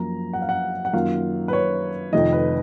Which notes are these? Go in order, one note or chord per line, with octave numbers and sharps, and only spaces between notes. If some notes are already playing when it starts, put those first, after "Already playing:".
Already playing: F#2 F3 A#3 A#5
F#5
F5
F#5
F#5
F#2 D#3 A#3 F4 F5
B4
C#5
F1 F2 D#3 D#5
B4